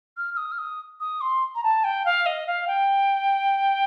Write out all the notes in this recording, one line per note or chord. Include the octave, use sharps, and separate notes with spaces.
F6
F6
D#6
F6
D#6
D#6
C6
A#5
A5
G5
F5
D#5
F5
G5